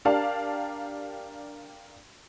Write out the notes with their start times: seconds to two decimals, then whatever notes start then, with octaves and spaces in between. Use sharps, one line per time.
0.05 D4 G4 A#4 D5 F5 A5